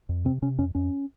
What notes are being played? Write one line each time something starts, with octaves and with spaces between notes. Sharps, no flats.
F2
C3 C4
C3 C#4
F2 C#4
F2 C#4